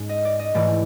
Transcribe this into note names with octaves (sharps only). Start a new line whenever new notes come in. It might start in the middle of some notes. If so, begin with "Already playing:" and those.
Already playing: G#2 G#3 C#4
D#5
D5
D#5
G#2 E3 A3 D5